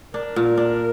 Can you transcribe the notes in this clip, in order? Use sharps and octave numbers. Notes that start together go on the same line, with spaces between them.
D4 A#4
A#2
D4